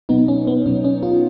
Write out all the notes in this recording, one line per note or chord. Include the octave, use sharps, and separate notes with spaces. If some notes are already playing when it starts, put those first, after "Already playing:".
B2 F#3 B3 D#4
C#4
B3
B2 F#3 C#4
C#4
C#4 F4